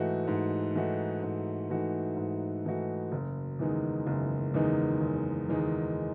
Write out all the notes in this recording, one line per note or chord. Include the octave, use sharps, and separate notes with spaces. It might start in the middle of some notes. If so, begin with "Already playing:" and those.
Already playing: G#2 E3 A3 D#4 F#4
G#2
E3 A3 D#4 F#4
G#2
E3 A3 D#4 F#4
G#2
E3 A3 D#4 F#4
F#1
E2 D#3 G#3 D#4
F#1
E2 D#3 G#3 D#4
F#1
E2 D#3 G#3 D#4